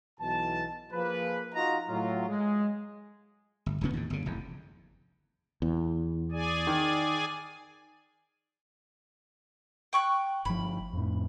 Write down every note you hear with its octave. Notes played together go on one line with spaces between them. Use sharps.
B1 B2 E3 A5
F3 A#3 G#4 B4
D#4 F4 F#4 D#5 A#5
A2 F#3 F4
G#3
G1
D#1 D2 C#3 B3
D#2 A2
G1 C#3
F1 E2
E2
G#4 D5 G#5
D#3
G5 C#6 F#6
G1 F3 B5
F2 A2